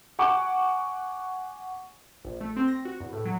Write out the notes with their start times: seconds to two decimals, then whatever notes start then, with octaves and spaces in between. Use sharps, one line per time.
0.19 F#5 G#5 C#6 D6
2.25 A#1
2.41 A3
2.57 C4
2.68 A#6
2.85 F#4
3.00 E2
3.13 A2
3.25 F#3